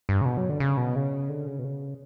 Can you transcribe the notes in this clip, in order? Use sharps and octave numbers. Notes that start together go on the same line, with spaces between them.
G2
C#3
B2
F#3
D3
C#3
B2
C#3
D3
C#3
B2
C#3